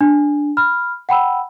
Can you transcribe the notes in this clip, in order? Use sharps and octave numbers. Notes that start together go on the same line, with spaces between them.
D4
B5 F6
F#5 G5 B5 E6